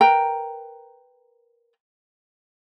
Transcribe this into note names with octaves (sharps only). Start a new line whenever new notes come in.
A#4 B4 G5 A#5